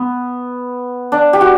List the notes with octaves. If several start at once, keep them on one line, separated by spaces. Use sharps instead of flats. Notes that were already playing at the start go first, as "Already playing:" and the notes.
Already playing: B3
D4
G4
F#4